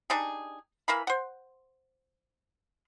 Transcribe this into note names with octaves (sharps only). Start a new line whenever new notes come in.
D4 D#4 G4 G#4
E3 A#4 F5 B5
C5 F#5